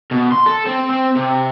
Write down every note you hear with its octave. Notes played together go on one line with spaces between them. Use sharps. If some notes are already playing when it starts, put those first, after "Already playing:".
B2
C6
A4
C4
C4
C3